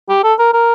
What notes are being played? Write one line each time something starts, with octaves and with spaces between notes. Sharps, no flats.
G4
A4
A#4
A#4